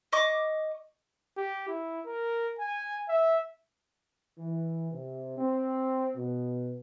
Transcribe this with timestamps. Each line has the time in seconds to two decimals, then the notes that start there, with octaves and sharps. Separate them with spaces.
0.12 D#5 C#6 D6
1.37 G4
1.68 E4
2.06 A#4
2.59 G#5
3.08 E5
4.39 E3
4.92 C3
5.38 C4
6.17 B2